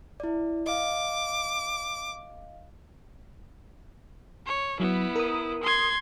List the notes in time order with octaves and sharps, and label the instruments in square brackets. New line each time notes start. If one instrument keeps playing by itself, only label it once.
[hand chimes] E4 D5
[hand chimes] D#5 F5 [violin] D6
[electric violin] C#5
[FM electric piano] F#3 [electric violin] B3 E4
[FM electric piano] A#4 D#6
[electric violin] C6 G#6